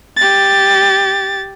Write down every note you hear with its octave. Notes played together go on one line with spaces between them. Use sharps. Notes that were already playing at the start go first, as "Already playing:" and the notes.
G4 A6